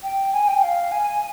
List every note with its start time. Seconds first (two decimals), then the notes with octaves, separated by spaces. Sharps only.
0.03 G5
0.33 G#5
0.48 G5
0.59 G5
0.63 F5
0.92 G#5